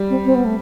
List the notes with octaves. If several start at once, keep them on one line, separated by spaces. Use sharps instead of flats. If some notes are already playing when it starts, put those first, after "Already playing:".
Already playing: G3
C4
C4
B3
A3